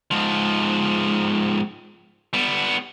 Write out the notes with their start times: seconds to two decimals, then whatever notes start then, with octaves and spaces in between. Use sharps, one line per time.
0.11 G#2 F3
2.33 G3 B3